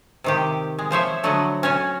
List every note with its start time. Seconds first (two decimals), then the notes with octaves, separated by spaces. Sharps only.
0.24 C3 D#3 G4
0.79 G#3
0.91 F3 C5 C#5 E5
1.24 D3 F#3 A3 D#5 F#5
1.63 C#4 F#4 C#5 G#5